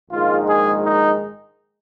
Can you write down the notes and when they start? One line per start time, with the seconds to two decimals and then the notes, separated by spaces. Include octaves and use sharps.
0.11 A#1 G#2 D#3 G#3 F4
0.48 G#4
0.85 D#4